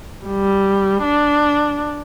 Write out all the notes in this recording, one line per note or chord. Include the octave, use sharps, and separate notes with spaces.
G3
D4